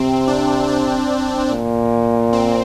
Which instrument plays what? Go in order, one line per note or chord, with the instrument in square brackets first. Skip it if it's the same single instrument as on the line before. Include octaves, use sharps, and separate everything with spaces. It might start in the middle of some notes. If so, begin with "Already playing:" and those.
Already playing: [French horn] C3 [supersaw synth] C4
[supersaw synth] D4
D4
[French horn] A#2
[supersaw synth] C4